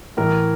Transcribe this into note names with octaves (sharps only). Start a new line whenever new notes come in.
A2 E3 A#4